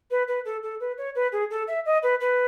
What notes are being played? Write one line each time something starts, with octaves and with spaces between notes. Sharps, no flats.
B4
B4
A4
A4
B4
C#5
B4
G#4
A4
E5
D#5
B4
B4